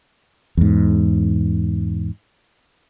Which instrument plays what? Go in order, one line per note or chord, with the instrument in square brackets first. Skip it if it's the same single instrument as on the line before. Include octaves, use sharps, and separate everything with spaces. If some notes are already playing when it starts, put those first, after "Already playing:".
[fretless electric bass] E2 G#2